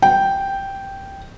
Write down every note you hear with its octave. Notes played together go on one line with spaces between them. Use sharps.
G5